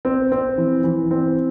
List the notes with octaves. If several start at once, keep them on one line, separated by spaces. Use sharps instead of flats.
C4
C4
E3
E3
C4